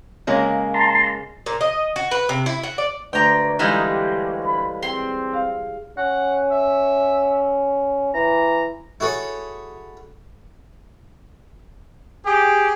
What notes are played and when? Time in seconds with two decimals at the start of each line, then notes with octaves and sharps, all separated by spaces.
0.27 C#3 G#3 A#3
0.74 A5 A#5 C6
1.46 A#2
1.61 D#5
1.96 F#4
2.11 B4
2.29 C3
2.46 E4
2.63 F#4
2.78 D5
3.13 D2 B4 D5 G5 A#5
3.59 E3 G3 G#3 D#4 A4 D#5 F5
3.90 G4
4.44 B5
4.82 C4 G#4 C6
5.33 F5
5.97 C#4 F#5
6.51 E5
8.14 E3 A#5
9.00 E4 F#4 G#4 A4 C#5
12.25 G4 G#4